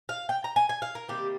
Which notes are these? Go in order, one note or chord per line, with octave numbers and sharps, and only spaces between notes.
F5
G5
A#5
G#5
G#5
F5
A#4
C3 D#3 G3 A#3 G4